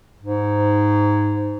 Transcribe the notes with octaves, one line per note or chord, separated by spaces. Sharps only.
G#2